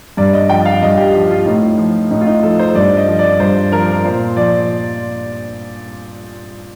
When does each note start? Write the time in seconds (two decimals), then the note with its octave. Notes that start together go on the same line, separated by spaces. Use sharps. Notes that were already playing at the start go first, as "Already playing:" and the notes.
0.17 G2 D5
0.33 D#5
0.49 F3 G5
0.65 F5
0.82 G2 D#5
0.98 G4
1.14 F3 G4
1.31 F4
1.46 A2 D#4
1.78 F3
2.11 A2 D#4
2.21 F4
2.27 D#4
2.43 F3 A4
2.59 C5
2.75 G2 D5
2.97 D#5
3.08 F3
3.19 D5
3.40 G2 C5
3.72 F3 A#4
4.04 A#2 C5
4.36 F3 D5